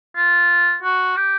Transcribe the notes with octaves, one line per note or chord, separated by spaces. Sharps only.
F4
F#4
G4